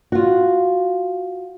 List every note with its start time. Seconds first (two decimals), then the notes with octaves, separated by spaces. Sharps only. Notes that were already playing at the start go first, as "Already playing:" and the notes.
0.12 F4 F#4